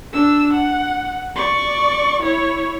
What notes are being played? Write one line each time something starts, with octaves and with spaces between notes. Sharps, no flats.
D4 E6
F#5
D5 C#6
E4 C#5